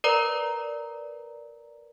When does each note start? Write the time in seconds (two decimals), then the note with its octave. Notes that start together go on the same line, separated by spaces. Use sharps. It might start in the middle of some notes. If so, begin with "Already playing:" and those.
0.04 A#4 B4 D5 A#5